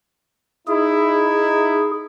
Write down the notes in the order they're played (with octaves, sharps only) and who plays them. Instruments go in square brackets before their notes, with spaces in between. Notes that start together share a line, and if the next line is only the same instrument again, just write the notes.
[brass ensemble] D#4 E4 [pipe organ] G#4